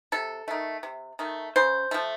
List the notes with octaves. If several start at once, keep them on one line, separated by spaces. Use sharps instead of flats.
C3 A4
D#3 A3
C3
D#3 A3
C#3 C5
F3 A3